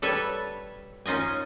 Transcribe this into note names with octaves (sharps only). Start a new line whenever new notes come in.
G3 A4 B4 C#5
C#4 D#4 F4 D#5 G#5